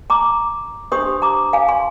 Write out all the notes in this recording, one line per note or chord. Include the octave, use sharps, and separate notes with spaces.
A#5 D6
D4 G4 C5 C6 D#6
A#5 D6
F5 G#5
G#5 C6